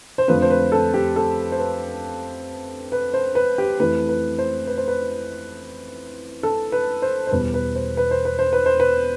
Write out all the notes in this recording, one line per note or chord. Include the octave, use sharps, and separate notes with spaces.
C5
F2 D3 F3 A3 B4
C5
B4
A4
G4
A4
C5
B4
B4
C5
B4
G4
F2 E3 A3 B4
B4
C5
B4
C5
B4
A4
B4
C5
C5
E2 B2 G3 B4
B4
C5
B4
C5
B4
C5
B4
C5
B4